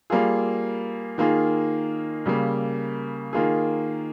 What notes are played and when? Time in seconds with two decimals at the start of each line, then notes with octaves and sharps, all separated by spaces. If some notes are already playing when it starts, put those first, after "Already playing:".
0.10 G3 A#3 F4 G#4
1.18 D#3 A#3 F4 G#4
2.26 C#3 G3 A#3
3.33 D#3 A#3 F4 G#4